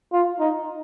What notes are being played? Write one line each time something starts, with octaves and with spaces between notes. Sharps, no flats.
F4
D#4